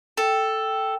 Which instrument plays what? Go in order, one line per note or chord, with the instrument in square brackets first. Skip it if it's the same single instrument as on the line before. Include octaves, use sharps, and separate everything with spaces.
[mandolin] A4 [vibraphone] G5